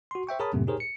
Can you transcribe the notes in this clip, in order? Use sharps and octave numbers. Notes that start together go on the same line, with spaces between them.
F#4 C6
C5 E5 G5 C#6
G#4 A#4 C#5 A5 B5 D#6
F#2 A2 C3 A3 B3
D#4 G4 G#4 A#4 C5 C#5
C#7